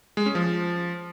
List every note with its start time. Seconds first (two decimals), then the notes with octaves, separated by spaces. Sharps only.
0.17 G#3
0.26 C#4
0.35 F3